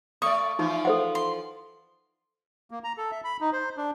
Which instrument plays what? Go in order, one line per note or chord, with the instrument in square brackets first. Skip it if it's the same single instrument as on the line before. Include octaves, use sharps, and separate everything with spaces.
[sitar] A3 D5 [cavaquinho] C#6 [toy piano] D#6
[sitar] E3 F3 F4 [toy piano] D#4
[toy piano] A4 C5 F#5
[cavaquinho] C6
[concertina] A#3
A#5
A4
E5
B5
D#4
C5
D4